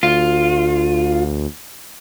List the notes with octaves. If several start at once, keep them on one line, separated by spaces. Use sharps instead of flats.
D2 F4